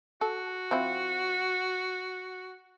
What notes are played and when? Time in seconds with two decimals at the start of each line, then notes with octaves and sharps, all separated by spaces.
0.21 F#4 A4
0.71 F3 C4 E4